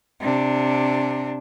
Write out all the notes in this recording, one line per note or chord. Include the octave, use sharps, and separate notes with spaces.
C3 D4